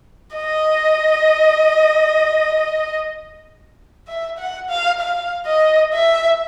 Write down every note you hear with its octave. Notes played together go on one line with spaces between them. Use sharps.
D#5
E5
F#5
F5
F5
D#5
E5